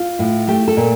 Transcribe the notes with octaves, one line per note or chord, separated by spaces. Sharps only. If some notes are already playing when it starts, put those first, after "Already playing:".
Already playing: F4
A2
A3 G4
A4
A#2